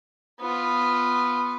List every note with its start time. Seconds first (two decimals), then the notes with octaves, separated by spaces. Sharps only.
0.40 B3 F4